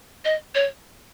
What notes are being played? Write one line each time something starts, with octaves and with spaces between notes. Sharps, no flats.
D#5
C#5